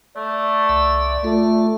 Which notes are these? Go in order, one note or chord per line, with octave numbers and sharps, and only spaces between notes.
A3 D5
C2 E5
A3 F4